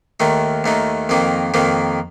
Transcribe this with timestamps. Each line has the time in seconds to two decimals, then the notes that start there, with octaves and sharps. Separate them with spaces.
0.20 D#2 D#3 A3 D#4
0.64 D#2 D#3 A3 D#4
1.09 F2 D#3 A#3 D#4
1.54 F2 D#3 A#3 D#4